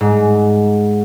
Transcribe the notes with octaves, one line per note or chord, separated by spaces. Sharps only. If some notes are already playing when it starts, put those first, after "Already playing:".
G#2